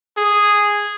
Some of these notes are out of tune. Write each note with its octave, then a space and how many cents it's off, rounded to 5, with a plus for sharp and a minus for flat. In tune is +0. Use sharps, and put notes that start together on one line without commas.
G#4 -5